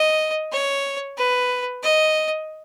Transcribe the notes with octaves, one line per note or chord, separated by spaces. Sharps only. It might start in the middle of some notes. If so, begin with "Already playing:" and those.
Already playing: D#5
C#5
B4
D#5